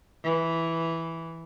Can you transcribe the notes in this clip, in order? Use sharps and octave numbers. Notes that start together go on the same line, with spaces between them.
E3